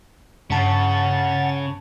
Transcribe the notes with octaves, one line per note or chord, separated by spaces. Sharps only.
G2 C#3 F#5 A5 A6